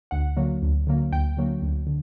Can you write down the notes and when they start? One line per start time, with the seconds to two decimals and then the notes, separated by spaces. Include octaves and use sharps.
0.11 D2 F#5
0.37 D3 F#3 A#3
0.62 D2
0.87 D3 F#3 A#3
1.12 D2 G5
1.37 D3 F#3 A#3
1.62 D2
1.87 D3